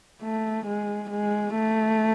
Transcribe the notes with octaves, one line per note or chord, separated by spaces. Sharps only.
A3
G#3
G#3
A3